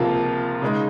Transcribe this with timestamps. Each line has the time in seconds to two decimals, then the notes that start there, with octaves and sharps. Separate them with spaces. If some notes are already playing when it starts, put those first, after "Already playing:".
Already playing: C#2 C3 F3 A#3 F4
0.62 C#3 G#3 D#4